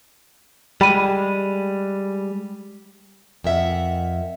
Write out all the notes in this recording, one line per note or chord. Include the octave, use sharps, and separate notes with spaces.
G3 G#3 G5 B5 D#7
F2 A#4 E5 F#5